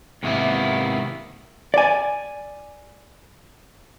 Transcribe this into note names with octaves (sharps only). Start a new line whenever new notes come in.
G#2 C3 D#3 A#3 B3 E4
D5 G#5